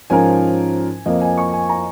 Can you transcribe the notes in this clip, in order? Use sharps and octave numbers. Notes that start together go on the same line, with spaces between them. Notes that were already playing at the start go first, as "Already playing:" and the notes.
G#2 F3 C#4 F4 A#4 G#5
F2 F3 A#3 D#5
G#5
C#6
G#5
A#5